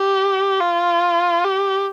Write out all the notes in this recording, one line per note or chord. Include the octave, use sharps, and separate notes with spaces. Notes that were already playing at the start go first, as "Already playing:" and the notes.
Already playing: G4
F4
G4